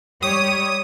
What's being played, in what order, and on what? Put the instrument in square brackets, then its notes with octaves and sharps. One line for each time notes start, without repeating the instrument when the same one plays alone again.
[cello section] G3 G4 C#5 [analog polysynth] D#6